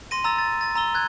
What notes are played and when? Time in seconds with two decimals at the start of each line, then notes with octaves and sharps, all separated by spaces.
0.11 C6 A#6 D#7
0.24 A#5 E6 A6
0.39 A6
0.61 A6
0.75 A#5 E6 G7
0.95 F#6 G#6